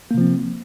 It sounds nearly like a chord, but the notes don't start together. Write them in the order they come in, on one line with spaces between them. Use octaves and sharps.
A#3 C3 F3 C4